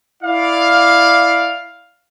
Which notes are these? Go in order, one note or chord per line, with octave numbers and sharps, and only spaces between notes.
E4 D5 F5